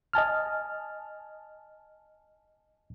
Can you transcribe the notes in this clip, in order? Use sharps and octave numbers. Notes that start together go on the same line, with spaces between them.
D#5 G#5 A5 F6